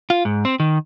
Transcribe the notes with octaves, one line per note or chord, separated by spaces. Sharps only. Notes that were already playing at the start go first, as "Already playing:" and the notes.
F4
G#2
C4
D#3